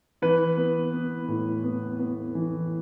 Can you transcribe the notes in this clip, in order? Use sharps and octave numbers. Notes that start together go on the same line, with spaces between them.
E3 B4
B3
B3
A2
B3
B3
E3